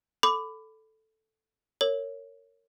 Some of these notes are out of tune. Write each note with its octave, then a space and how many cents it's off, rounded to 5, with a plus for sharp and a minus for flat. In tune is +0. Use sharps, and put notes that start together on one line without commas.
A4 +0 B5 +20 D6 +0
A#4 -25 C#5 +0